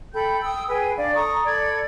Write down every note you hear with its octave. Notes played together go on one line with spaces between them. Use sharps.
A4 G5 B5 G6
G5 D#6 E6
G#4 B4 G5 G#5
D4 D5 F5
A4 A#5 C#6 D#6
A4 D5 B5 G#6